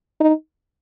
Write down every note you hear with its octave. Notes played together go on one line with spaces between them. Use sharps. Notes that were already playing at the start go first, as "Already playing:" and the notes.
D#4